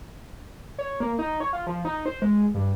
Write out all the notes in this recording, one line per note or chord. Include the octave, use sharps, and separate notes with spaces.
C#5
A#3
D#4
C#5
F4
F3
D#4
C5
G#3
G2